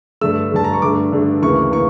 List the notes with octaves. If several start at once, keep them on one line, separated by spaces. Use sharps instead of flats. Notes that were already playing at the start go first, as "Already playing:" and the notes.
G2 D3 A3 E6
G2 D3 A3 A5
A#5
C#6
G2 D3 A3 D6
G2 D3 A3
D2 C#3 E3 A#3 C#6
C#3 E3 A#3 C#6